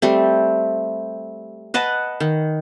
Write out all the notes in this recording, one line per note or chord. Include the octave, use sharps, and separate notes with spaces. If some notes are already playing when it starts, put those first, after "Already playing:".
G3 A3 C4
B4 D#5 F#5 A5
D#3